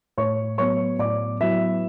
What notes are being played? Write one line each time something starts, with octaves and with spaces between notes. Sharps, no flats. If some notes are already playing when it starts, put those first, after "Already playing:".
A2 C#5 C#6
F#3 B3 C#5 C#6
A2 D5 D6
F#3 B3 E4 E5